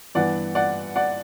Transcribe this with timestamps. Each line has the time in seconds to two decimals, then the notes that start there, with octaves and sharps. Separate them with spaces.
0.15 G2 E3 B3 D5 F#5
0.55 D5 F#5
0.96 D5 F#5